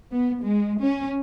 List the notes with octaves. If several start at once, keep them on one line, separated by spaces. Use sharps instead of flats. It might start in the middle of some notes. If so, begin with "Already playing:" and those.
B3
G#3
C#4